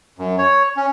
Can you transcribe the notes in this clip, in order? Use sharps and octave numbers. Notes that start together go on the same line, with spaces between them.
F#2
C#5
C#4